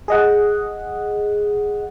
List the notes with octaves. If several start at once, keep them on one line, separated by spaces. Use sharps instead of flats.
G#4 D#5 F#5